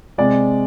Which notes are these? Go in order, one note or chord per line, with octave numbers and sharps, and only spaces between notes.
C3 G#3 D5